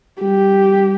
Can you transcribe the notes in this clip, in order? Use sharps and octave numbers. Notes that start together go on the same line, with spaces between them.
G3 G4